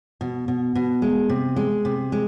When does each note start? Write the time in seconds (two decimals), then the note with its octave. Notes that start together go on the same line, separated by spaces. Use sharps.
0.21 B2
0.48 B2
0.75 B2
1.02 G#3
1.29 C3
1.56 G#3
1.85 C3
2.12 G#3